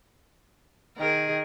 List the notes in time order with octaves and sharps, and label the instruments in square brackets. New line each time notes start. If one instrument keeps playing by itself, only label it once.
[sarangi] D#3 [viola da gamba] G#4 A#4